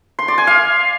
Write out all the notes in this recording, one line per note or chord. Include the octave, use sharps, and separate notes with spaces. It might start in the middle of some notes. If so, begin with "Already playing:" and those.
C6
D5
G#5
F5